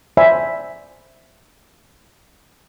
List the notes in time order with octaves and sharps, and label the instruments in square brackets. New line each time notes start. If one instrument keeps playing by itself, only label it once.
[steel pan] C5 D5 E5 G#5 B5